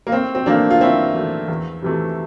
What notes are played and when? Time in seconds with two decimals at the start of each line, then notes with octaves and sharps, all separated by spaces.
0.07 A#3
0.12 A2 C4
0.35 C4
0.46 E3 A3 A#3 D4
0.71 F4
0.81 A2 C4 E4
1.14 E3 A3
1.48 E2
1.82 C3 E3 A3